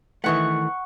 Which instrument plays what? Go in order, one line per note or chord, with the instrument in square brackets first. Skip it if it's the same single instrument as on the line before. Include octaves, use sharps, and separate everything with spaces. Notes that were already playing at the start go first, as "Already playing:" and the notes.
[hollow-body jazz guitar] D#3 E3 A3 [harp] F#5 C#6